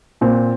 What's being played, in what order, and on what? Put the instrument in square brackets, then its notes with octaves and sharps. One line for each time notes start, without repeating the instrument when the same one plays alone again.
[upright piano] A#2 C4